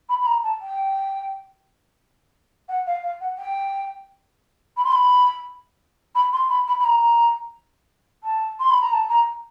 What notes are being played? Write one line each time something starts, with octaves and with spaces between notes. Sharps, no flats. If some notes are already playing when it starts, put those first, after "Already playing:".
B5
B5
A#5
A5
G5
F#5
F5
F5
F#5
G5
B5
C6
B5
B5
C6
B5
B5
B5
A#5
A5
C6
B5
A#5
A5
A#5